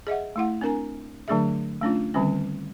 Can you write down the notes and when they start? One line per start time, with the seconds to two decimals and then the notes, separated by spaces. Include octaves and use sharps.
0.07 G#4 D#5 E5 F#5
0.36 A3 E4 F#5
0.61 C4 D4 A#4 G#5 A#5
1.28 D3 F#3 A3 D4 G#4 E5
1.82 A3 C#4 D4 F4
2.14 D3 D#3 G3 C4 C#4